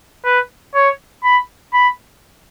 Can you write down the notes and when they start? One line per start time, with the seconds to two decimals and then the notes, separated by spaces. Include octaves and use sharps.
0.25 B4
0.74 C#5
1.24 B5
1.73 B5